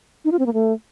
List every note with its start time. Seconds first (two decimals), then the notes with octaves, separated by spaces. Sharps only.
0.25 D#4
0.32 F4
0.39 C4
0.46 A#3
0.53 A3